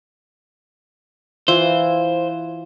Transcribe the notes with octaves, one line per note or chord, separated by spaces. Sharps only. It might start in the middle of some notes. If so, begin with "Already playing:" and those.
E3 E4 F4 C5